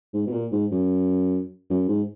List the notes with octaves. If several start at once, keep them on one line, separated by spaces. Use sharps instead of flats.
G#2
B2
A#2
G#2
F#2
F#2
G#2